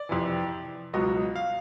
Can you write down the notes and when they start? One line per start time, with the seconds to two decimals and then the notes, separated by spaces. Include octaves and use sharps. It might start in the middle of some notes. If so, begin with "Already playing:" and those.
Already playing: D5
0.09 F2 C3 E3
0.93 C#2 B2 F#3 D#5
1.36 F5